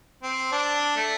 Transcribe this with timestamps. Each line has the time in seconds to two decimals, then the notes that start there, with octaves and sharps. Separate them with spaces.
0.23 C4
0.52 D4
0.96 A3